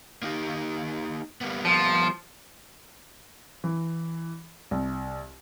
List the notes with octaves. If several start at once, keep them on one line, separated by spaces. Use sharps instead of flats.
A#3 D#4 G4
G3 A#3 B3
F3
E3
C2